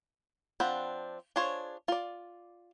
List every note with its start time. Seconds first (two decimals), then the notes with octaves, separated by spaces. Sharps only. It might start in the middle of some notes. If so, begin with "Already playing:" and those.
0.60 F3 C4 D4 F#5 B5
1.36 D4 F4 G#4 C5 C#5
1.88 F4 D5